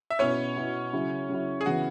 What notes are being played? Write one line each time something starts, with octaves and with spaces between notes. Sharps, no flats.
E5
B2 B3 C#4 E4 C#5
B2 B3 E4
C#3 F#3 E4
C#3 F#3 E4
G#4
C#3 E3 B3 E4 F#4